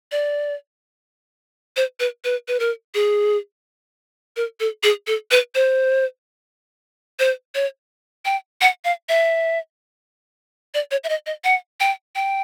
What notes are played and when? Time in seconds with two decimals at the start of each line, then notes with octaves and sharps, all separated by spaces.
0.12 D5
1.76 C5
2.00 B4
2.24 B4
2.48 B4
2.60 A#4
2.94 G#4
4.37 A#4
4.60 A4
4.83 G#4
5.07 A4
5.31 B4
5.55 C5
7.19 C5
7.55 C#5
8.25 G5
8.61 F#5
8.85 F5
9.09 E5
10.74 D5
10.91 C#5
11.04 E5
11.09 D#5
11.26 D#5
11.44 F#5
11.80 G5
12.15 G5